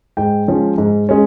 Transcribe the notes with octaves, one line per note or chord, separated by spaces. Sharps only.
G#2 G5
F3 G#3 C#4
G#2
G#3 C#4